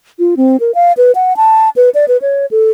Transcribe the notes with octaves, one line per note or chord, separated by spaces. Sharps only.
F4
C4
A#4
F5
B4
F#5
A5
B4
D5
B4
C#5
A4